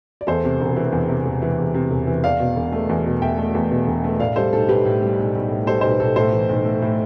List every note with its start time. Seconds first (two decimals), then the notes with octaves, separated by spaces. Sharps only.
0.21 D5
0.27 E2 A4 C5
0.44 C3
0.60 E1
0.76 E3
0.92 E2
1.09 C3
1.26 E1
1.42 E3
1.58 E2
1.74 C3
1.91 E1
2.07 E3
2.24 E2 D5 F5
2.40 B2
2.56 E1
2.72 A3
2.89 E2
3.06 B2
3.21 E1 E5 G5
3.38 A3
3.55 E2
3.71 B2
3.87 E1
4.04 A3
4.19 A2 D5 F5
4.36 G3 A4 C5
4.53 B1 A4
4.69 B1 G4 B4
4.85 A2
5.02 G3
5.18 B1
5.35 B1
5.51 A2
5.67 G3 A4 C5
5.81 B1 C5
5.91 B4
5.99 B1 A4
6.16 A2 A4 C5
6.33 E3
6.49 B1
6.65 A3
6.82 A2